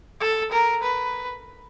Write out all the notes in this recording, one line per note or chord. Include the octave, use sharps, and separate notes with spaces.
A4
A#4
B4